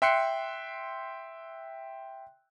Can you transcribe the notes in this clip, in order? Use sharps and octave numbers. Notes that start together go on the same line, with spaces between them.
E5 G5 C6 F#6 C7 C#7